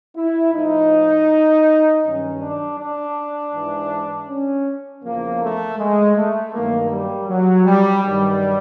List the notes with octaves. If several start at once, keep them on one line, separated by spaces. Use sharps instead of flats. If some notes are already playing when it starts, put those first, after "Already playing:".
E4
A2 F3 D#4
G2 D#3 F#3 C#4
D4
D4
G#2 E3
C#4
E2 C#3 F3 A#3
A3
G#3
A3
G2 D#3 F#3 A#3
G3
F#3
G3
G2 D#3 F#3 G3